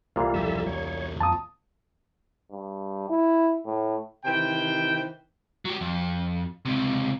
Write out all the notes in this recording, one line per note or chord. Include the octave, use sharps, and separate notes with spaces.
C2 A#2 E3 A3 F4
E1 G2 F3 A4 E5
E2 F#3 C#5
F2 A#2 A5 D#6
G2
E4
A2
C3 D#3 E3 C5 G5
F#3 G4
F2
C#2 C3